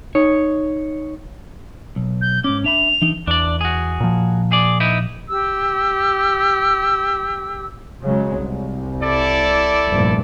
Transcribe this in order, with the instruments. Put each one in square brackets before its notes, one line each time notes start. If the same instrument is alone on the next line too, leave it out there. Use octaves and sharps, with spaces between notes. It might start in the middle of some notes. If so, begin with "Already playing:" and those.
[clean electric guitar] D#4 C#5
B1
[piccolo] G6
[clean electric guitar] G#2 C#4 [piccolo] D6
[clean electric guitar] D4 E5 B5 [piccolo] F7
[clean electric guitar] E3 D4 D#4
[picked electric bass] E2 [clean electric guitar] D4 D5
[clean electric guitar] F#4 G#4
[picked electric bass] A#2 F3
[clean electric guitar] G#4 D5
D#4 E4 B4
[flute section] G4 E6
[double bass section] C#3 F#3 G#3
C2
[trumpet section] E4 A4 D5
[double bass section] F1 G2 A#2